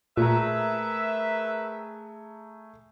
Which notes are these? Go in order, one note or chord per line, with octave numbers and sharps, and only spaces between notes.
A#2 A3 G#4 A#4 B4 E5 A#5